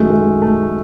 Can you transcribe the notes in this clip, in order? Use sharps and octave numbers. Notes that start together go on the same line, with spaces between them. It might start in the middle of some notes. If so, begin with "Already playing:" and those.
Already playing: F#2 D#3 F#3 G#3 A3
G#3
A3